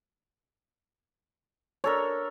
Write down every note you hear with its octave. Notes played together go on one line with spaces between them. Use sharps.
D4 A4 A#4 C#5